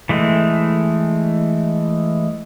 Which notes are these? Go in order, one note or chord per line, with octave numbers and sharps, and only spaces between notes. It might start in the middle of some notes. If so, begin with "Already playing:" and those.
E3 G#3 A3